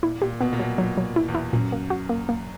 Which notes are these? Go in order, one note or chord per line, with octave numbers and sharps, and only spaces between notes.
A#2 E4
A#2 G4
B2 B3
A#2
B2 F#3
A#2 F#3
F#3
E4
E2
E4
F#2 A#2
A#3
F#4
A#3
A#3